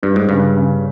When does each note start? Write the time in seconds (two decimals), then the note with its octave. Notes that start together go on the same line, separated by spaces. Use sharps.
0.02 G2 G3
0.16 G#2
0.29 G2 C#3
0.56 C#3